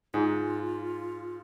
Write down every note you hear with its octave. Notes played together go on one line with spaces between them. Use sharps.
G#2 F4